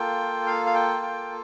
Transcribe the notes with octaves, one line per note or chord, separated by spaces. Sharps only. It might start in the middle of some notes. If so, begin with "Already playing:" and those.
Already playing: A#3 F4 A4 G5
F5
F5
G5
G5